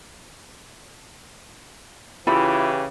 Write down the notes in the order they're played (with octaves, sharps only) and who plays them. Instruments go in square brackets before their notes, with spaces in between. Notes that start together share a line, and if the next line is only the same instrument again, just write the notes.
[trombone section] C#3 E3 G4 [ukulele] E4 F4 B5